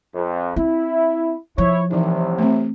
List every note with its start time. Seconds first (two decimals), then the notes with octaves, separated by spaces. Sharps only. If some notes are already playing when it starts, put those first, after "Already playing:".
0.15 F2
0.56 C4 E4
1.58 F3 E4 C#5
1.91 C2 A2 C3 E3 D#4
2.38 A3 C4